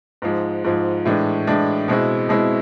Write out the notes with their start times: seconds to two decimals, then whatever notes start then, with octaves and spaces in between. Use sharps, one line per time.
0.22 G#2 F3 G#3
0.64 G#2 F3 G#3
1.05 A2 E3 G#3 D4
1.47 A2 E3 G#3 D4
1.88 B2 G#3 C4 E4
2.29 B2 G#3 C4 E4